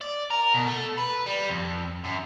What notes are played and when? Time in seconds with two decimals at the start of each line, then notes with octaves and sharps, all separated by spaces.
0.01 D5
0.30 A#4
0.54 B2
0.67 A3
0.98 B4
1.27 G3
1.49 F2
2.04 F#2